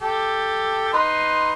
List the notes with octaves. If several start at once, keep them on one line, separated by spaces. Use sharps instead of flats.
G4 A4
D#4 B4 C6